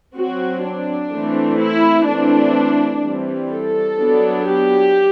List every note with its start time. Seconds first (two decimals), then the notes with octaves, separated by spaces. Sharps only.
0.17 F#3 C4 F#4
0.65 D4
1.12 E3 A3 C4
1.60 E4
2.07 E3 A3 C4 D4
3.03 E3 G3 C4
3.51 A4
3.98 F#3 B3 D4
4.46 G4